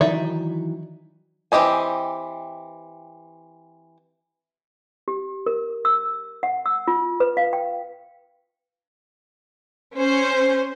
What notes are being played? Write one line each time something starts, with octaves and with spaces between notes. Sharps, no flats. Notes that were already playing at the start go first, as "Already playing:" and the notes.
D#3 E3 F#3 D#4 D5 E5
E3 C4 G4 D#5 G#5
G4
A#4
E6
F#5
E6
F4
B4
F5
G5
C#4 C5